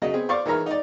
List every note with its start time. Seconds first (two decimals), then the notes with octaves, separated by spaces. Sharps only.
0.02 C#3 F#3 D#5
0.14 B3 C4 G#4
0.29 C5 D5 F5 C#6 D6
0.46 D#3 E3 G#3 C#5 A#5 F6
0.66 D#4 D5